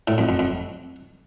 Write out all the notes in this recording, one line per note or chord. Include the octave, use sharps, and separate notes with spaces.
A2
F2
F2
F2